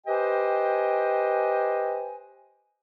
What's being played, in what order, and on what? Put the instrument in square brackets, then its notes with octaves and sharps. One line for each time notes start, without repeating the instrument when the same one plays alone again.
[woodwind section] G4 B4 C5 D#5 G5 G#5